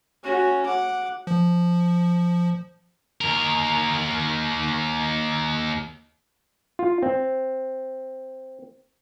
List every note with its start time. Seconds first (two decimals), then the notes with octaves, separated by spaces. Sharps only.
0.24 C#4 F#4
0.66 F#5 D6
1.27 F3
3.21 D#2 A#4
6.79 F4
7.03 C4